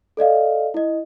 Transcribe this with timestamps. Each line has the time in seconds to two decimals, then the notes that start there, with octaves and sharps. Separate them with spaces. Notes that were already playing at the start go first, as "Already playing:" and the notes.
0.17 A4 D5 D#5 F5
0.74 E4 D#5